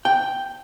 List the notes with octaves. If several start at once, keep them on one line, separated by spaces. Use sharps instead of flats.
G5